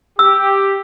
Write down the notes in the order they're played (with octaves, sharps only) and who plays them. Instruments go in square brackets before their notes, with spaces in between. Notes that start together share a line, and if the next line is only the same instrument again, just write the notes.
[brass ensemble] G4 [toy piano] E6